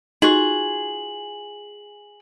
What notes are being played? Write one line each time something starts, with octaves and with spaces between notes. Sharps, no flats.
D#4 F4 F#4 G#4 F#7